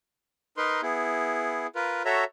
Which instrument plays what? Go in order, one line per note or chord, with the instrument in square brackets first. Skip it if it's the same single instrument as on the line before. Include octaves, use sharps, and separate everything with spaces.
[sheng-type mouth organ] D#4 A#4 B4 C6
B3 E4 G#4
F4 A#4 B4
F#4 A4 C#5 E5 A#5